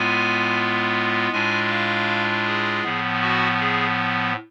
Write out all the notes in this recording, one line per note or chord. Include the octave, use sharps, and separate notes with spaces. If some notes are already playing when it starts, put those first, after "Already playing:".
Already playing: A2 G#3 B3 F4 G#5
A2 G#3 D4 F4 G#5
F5
G#4
A2 F3 B3
F#4
G#4